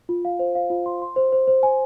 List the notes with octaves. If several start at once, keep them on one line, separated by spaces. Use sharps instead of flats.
F4
F5
C5
F5
F4
C6
C6
C5
C5
C5
G#5